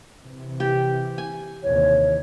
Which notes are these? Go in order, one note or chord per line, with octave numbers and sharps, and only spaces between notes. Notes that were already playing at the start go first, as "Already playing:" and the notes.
C3 E3
G4
G#5
D#2 C3 E3 C#5